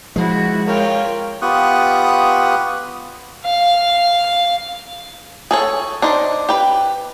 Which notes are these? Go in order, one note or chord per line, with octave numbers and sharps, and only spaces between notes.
F3 G#3 E4 F#4
F4 A#4 C#5 G5
B3 F4 G4 C#6 D#6 F#6
F5
G#4 A4 C#5
D4 D#4 C5
G4 B4